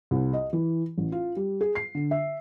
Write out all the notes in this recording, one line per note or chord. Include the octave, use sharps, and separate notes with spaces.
C2
D#5
E3
A1
F4
G3
G#4
C7
D3
E5